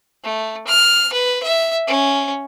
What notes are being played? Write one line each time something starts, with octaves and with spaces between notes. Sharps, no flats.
A3
F6
B4
E5
C#4